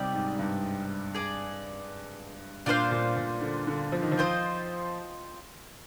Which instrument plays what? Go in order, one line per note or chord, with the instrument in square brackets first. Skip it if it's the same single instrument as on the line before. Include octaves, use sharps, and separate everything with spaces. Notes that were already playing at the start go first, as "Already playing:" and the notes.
Already playing: [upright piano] C3 G3 [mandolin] D#4 G4 D5
[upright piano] G#2
G2
[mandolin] G#4 D5 G#5
[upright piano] A#2 [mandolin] D4 F4 C5 F5
[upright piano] A#2
A#2
D3
D3
F3
D#3
F3
[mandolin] C4 F4 C5 D#5